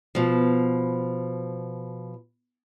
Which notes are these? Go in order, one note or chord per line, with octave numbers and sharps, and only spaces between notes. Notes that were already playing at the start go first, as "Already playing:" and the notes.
B2 F3